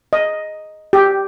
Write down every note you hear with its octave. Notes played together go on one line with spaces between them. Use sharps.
D#5
G4